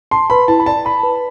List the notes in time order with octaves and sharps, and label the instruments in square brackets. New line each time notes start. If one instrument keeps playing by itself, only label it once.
[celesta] A5 [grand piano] C6
[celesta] B4 [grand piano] B5
[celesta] E4 [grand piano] A5
[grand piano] B5
[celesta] D5 [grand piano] A5
[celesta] A5 [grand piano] B5
[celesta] B4